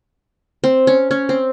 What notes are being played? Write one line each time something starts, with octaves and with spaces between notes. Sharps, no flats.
C4
C#4
C#4
C4